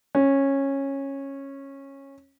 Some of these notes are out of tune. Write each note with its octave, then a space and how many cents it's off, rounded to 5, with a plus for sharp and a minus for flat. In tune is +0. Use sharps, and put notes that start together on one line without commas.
C#4 -15